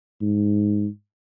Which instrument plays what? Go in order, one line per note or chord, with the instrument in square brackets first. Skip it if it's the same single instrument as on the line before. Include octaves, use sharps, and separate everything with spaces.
[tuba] G#2